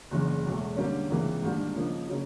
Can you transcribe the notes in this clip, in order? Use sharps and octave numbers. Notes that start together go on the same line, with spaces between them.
F#1 E2 C#3 E3
E1 E2 B2 F#3 A3
D3 G3 A#3 C#4
C#2 C3 E3 G3 A#3
G#2 D#3 G3 A#3 D4
C#3 F3 A#3 D#4
C#3 F#3